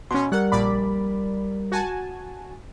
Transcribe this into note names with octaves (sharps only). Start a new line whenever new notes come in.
B2 C#4 C6
G3 A#4 F#5
A#1 D5 B5
F#4 G#5 A5